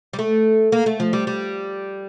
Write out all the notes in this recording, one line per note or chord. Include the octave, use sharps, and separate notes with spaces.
G3
A3
A#3
A3
F3
G3
G3